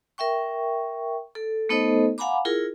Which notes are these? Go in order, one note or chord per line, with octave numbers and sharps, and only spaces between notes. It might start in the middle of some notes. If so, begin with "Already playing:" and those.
A#4 E5 G5 C#6
A4
A3 B3 D#4 A4 C5 D#5
F5 F#5 G#5 A#5 B5 D6
E4 F4 G#4 A#4